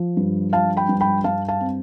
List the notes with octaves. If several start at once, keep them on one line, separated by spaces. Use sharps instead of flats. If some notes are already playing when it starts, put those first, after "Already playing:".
Already playing: F3
G2
F3 F5 A5
G5 B5
G2
G5 B5
G2 F5 A5
F5 A5
C4